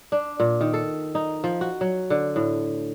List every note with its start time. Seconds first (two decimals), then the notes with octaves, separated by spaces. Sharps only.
0.12 D4
0.40 A#2
0.61 D#3
0.73 A4
1.15 D#4
1.44 F3
1.61 F#4
1.81 F#3
2.10 D3
2.36 A2